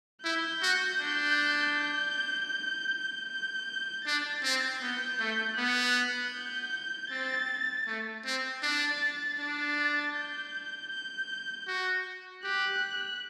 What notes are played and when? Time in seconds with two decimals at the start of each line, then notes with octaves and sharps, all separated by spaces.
0.24 E4 G6
0.62 F#4
1.00 D4
3.29 G6
4.05 D4 A6
4.43 C4
4.82 B3 G6
5.20 A3
5.58 B3 F#6
6.34 G6
7.10 C4 A6
7.87 A3
8.25 C4
8.63 D4 A6
9.39 D4 A6
10.15 G6
10.92 G6
11.68 F#4
12.44 G4 F#6